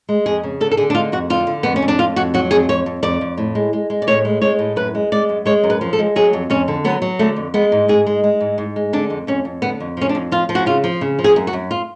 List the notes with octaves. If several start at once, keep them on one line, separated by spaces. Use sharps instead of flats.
G#3
F2 G#4
C#3
D3 A4
A4
D3 G#4
D4
G#3 F4
F2 F#4
D3 F4
D3
F2 B3
C#4
F2
D4
F2 F4
F2 F#4
F#3 F#4
F2 G#4
F2 C#5
F2
F2 D5
F2
A2
G#3
G#3
G#3
D5
A2 C#5
G#3
G#3 C#5
A2
F#2 B4
G#3
G#3 D5
F#2
G#3 C#5
F#2
B4
F3
A4
G#3
F#3 G#4
F2
F2 C#4
D3
F#3 B3
F#3
D3 A3
F2
G#3 B3
G#2
G#2 G#4
G#3
G#3
G#2
G#2
G#3
D3 D4
F2
F2 C#4
F2
D3 B3
F2
F3 C#4
D4
F2
F3 F4
F3
F#4
C#3 F4
F3
C#3
F3
G#4
F#2
F#4
F#2
F4